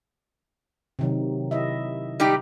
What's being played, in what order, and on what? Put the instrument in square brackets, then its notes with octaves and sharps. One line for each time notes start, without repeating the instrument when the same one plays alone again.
[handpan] C3 D#3 F#3
E4 D#5 E5
[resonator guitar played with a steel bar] G3 D#4 G4